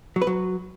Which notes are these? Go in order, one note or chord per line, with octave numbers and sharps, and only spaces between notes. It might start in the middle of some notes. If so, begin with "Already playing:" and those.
F#3
B4
F#3